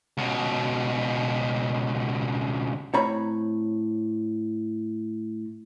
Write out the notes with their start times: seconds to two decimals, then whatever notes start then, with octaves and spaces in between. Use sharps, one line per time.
0.18 C#2 B2
2.94 A2 C4 C#5 A#5 B5